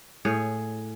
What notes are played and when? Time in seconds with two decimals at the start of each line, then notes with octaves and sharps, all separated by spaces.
0.25 A2 G#4 C#5